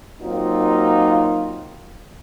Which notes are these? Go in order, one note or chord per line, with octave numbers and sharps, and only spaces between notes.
F#3 A#3 C4 D#4 F4